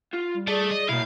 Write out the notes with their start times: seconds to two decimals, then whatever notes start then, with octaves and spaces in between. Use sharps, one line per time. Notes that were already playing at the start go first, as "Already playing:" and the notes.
0.14 F4
0.34 G3
0.48 A3 G#4 D5
0.71 D#5
0.89 B2 A#3 E4 F5